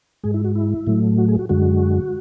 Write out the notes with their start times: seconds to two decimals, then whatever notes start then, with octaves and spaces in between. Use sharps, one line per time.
0.24 G#2 G#3 G#4
0.34 E4
0.45 F#4
0.55 E4
0.87 A2 F#3 A3
1.18 F#4
1.28 G#4
1.39 F#4
1.49 F#2 D3 G#3 F#4